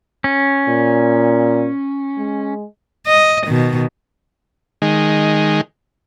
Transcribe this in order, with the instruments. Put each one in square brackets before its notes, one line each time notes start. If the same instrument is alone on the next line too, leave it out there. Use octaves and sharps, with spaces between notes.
[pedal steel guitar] C#4
[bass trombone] A#2
G#3
[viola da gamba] D#5
B2 D#3
[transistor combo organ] D#3 G#3